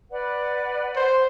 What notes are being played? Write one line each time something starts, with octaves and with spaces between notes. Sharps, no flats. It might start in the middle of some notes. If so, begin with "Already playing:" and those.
B4 D5 F#5
C5